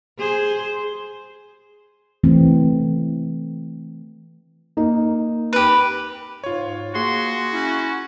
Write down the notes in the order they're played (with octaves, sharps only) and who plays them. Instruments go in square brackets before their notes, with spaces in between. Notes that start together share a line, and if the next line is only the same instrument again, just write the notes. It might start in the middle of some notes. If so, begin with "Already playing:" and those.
[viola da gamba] G#4 C5
[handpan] E3 A3 C4
[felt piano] A#3 D#4
[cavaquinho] G4 B4
[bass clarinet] G#2 [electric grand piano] F4 C#5
[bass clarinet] A#3 [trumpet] F#4 [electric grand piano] G#4 [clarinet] C6
[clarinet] C#4 [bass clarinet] E4